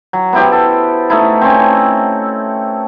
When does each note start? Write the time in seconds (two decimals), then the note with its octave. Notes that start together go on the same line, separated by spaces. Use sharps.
0.13 F#3
0.33 B3 E4 G4 C5
0.52 A4
1.10 A3 D#4 E4
1.41 C4 C#4